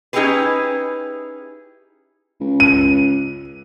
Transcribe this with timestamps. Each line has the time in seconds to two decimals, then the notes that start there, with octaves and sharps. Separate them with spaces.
0.13 C#4 D#4 E4 G4 G#4 B4
2.41 C#2
2.60 D#7